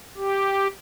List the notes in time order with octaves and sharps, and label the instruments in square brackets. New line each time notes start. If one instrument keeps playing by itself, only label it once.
[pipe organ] G4